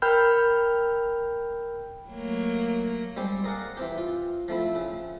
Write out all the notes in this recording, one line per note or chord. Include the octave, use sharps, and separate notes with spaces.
A#4 G5 B5 F6 G6
F#3 A3 A#3
G3 G#3 C4 G4
G#4 A#4 D5 F5 F#5
E3 C4 G4
F4
F3 A3 C4 E4
C#3